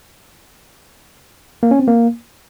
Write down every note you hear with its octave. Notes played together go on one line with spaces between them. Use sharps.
A#3
C#4
C4
A#3